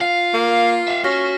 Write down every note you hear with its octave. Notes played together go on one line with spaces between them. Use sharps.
F4 F5 C7
A#3
E5 F5
C#4 F#4 F6 A#6 B6